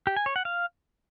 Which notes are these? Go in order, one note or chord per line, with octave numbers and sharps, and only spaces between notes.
G4
G#5
C#5
F#5
F5